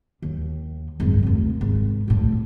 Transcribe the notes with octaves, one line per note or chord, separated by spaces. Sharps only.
D#2
G#1 F#2
F1 D#2
G#1
A#1 A2